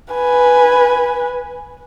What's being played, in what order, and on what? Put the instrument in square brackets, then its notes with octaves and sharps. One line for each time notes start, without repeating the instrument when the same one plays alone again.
[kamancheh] B4 G#5